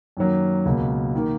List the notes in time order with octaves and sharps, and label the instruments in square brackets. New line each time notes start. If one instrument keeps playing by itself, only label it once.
[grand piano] F#2 D#3 F#3 A#3
C#2 B2 A#3
D#3 A#3